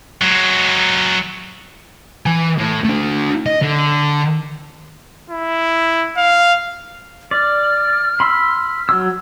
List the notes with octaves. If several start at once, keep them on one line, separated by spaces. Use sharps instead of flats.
F#3 G#3
E3 G#5
A2
A3 D4
D#5
D3
E4
F5
D5 F6
B5 C6 E6
F#3 E6